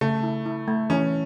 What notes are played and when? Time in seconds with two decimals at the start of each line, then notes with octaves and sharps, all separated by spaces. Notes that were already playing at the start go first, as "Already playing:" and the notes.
0.01 C#3 A3
0.23 E4
0.46 E4
0.68 A3
0.90 E3 C#4